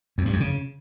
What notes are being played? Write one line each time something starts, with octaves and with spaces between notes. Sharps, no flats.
F2
G2
F2
C#3